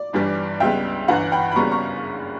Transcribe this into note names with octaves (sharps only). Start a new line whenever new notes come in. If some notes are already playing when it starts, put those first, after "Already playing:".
Already playing: D5
G1 G2 E3 G3
C#2 C#3 G3 B3 E5 G5
G1 G2 E3 F#5 A#5
G5 B5
B5
F#1 F#2 C#3 G3 B3 A#5 C#6
A#5 C#6